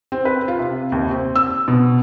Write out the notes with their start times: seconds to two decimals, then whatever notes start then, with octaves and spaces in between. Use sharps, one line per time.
0.12 C4
0.25 B4
0.48 F4
0.59 C3
0.92 D#2
1.11 C4
1.36 E6
1.68 B2